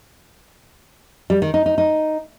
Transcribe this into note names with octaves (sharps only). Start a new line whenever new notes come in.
G3
D#3
D#4
D#4
D#4